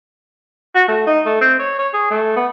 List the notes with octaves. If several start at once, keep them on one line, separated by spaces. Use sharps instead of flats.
F#4
A3
D#4
A3
C4
C#5
C#5
G#4
A3
B3